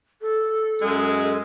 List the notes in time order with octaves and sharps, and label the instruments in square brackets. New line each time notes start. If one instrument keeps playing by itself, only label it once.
[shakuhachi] A4
[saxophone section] F#2 G#3